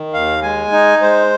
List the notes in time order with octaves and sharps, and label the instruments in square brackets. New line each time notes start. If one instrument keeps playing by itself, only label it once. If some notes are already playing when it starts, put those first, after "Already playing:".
Already playing: [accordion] D#3
D#2 F5
G#3 G#5
D#4
G#3 C5